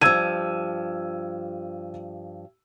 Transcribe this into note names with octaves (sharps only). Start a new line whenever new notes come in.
G2 F3 E6 G#6 D#7